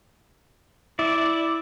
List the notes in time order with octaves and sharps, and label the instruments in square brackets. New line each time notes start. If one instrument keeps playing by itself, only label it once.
[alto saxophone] E4 [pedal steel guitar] D5